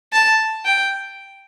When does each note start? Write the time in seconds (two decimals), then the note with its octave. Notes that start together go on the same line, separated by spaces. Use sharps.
0.13 A5
0.65 G5